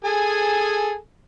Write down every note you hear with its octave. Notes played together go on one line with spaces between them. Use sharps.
G#4 A4 G#5